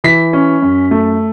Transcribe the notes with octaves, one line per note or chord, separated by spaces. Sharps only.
E3 B6
C#4
F#2
A3